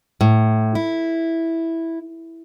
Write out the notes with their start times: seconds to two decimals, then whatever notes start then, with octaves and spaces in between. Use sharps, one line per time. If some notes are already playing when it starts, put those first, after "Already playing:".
0.21 A2
0.75 E4